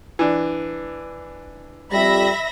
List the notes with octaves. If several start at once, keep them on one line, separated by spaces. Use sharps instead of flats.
E3 D4
F2 G3 E5 B5 A#6